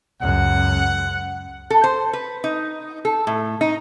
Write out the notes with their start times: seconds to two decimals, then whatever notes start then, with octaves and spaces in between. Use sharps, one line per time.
0.21 C#2 F#2 F#5
1.70 A4
1.84 C5
2.13 B4
2.44 D#4
3.05 A4
3.27 A2
3.61 D#4